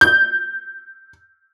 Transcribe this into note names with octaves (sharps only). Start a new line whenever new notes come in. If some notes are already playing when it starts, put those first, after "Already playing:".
G6